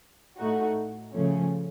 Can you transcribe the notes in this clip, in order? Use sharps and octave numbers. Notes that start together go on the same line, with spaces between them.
A2 A3 D#4 F#4
C#3 F3 A3 C#4